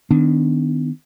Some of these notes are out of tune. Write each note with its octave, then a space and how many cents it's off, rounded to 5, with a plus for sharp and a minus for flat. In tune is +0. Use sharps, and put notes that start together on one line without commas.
D#3 +0 B3 +30 D4 +0